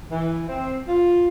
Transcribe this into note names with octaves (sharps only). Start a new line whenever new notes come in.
E3
C4
F4